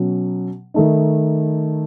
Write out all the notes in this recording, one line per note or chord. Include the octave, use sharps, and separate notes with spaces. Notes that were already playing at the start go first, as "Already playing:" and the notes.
Already playing: B2 F#3 C#4
D#3 A3 D#4